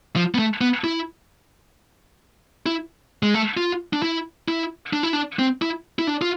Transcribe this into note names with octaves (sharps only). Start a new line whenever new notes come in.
F3
B3
A3
B3
E4
E4
G#3
A3
F4
D4
E4
E4
D4
E4
D4
C4
E4
E4
D4
F4